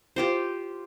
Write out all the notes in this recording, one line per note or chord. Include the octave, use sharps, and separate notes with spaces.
F4 G4 C5